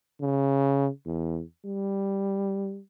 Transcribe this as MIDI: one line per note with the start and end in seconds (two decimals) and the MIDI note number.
0.21 0.89 49
1.06 1.42 40
1.65 2.80 55